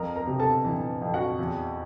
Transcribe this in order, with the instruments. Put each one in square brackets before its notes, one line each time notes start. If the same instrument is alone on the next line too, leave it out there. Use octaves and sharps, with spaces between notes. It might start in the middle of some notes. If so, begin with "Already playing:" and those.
Already playing: [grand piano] F2 A#4 A#5
A#4 A#5
C3
A4 A5
E3
F2
F#4 F#5
E2